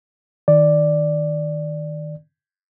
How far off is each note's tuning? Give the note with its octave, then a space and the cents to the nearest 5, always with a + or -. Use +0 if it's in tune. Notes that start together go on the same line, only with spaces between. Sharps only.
D#3 +0 D5 +0